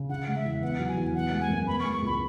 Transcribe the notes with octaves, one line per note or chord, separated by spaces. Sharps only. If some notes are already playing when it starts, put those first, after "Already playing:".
Already playing: C#3
C#4 F#5
G#3
E5
E2
B3 F#5
F#3
G#5
E2
B3 F#5
G#3
G#5
F#2
B3 B5
C#6
G#3
C#6
C#2 B5